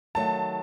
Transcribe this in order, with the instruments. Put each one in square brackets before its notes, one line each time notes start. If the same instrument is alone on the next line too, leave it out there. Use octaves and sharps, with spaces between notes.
[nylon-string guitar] D#3 F#3 A3 [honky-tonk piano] A5